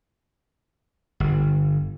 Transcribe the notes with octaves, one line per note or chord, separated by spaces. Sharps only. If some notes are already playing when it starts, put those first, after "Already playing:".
G1